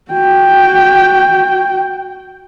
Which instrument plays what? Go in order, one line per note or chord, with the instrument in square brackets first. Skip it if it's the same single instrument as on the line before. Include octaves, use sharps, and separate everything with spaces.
[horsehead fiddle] F#4 G5